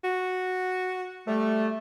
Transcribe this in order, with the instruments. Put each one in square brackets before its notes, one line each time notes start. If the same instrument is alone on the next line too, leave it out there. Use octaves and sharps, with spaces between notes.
[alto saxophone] F#4
[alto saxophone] G3 [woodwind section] A3